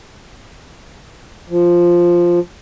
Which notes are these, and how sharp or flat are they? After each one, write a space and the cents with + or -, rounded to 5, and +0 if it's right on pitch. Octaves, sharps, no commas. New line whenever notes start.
F3 +0